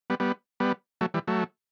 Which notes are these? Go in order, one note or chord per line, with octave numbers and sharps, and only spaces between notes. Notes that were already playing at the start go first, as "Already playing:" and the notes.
G3 B3
G3 B3
G3 B3
F#3 A3
E3 G3
F#3 A3